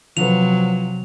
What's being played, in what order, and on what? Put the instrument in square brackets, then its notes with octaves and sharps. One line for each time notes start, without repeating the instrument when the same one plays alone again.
[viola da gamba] C3 F#3 [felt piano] F3 B4 [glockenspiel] F7